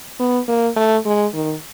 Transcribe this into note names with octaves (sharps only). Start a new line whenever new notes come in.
B3
A#3
A3
G#3
D#3